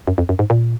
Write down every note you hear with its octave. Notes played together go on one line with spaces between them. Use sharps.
F#2
F2
F#2
G#2
A#2